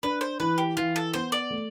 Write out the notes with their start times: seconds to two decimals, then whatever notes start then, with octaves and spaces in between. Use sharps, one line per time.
0.03 D4 B4
0.21 C5
0.40 E3 B4
0.58 G4
0.77 E3 F4
0.96 A4
1.14 B3 C5
1.32 D5
1.50 A3